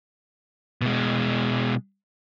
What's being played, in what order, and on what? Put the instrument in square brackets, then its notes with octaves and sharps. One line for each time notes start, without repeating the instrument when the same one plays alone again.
[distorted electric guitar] B2 G#3